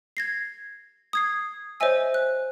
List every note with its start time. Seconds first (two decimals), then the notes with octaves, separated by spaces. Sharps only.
0.17 G#6 A#6 C7
1.13 D#6 G#6 C7
1.80 C5 C#5 D#5 E5 G#5 E6
2.14 F#6